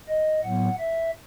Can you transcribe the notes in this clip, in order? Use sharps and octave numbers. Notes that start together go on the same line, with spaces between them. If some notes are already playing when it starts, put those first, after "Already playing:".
D#5
A2 F#3 B3 F#5
E5